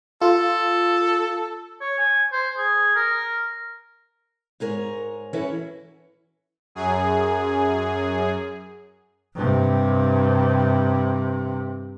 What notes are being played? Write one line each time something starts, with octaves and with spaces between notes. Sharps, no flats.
F4 A4
C#5
G#5
C5
G#4
A#4
G#2 G#4 A#4 C#5
E3 C#4 E4 F#4 A4 C#5
F#2 G#4
G2 C3